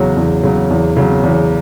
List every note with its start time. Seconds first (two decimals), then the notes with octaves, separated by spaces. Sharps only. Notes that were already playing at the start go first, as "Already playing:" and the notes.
Already playing: E2 C#3 F#3
0.17 E2
0.43 C#3 F#3
0.71 E2
0.97 C#3 F#3
1.23 E2